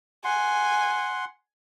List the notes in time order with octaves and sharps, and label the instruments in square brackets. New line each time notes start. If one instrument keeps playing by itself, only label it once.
[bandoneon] F#5 C6 [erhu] G#5